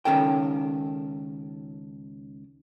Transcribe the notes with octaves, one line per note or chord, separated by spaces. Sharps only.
C#2 D#3 C#4 A4 A#4 G5